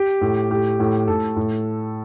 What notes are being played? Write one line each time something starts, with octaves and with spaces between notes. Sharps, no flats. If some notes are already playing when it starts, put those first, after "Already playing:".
Already playing: G4
A2
A2 G4
A2
A2 A4
A2